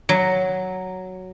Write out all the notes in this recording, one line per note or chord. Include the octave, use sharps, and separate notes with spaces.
F#3